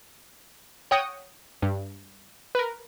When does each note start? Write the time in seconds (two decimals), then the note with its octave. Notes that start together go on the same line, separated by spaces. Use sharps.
0.91 C#5 F#5 G5 D#6 A#6 C#7
1.62 G2
2.55 A#4 B4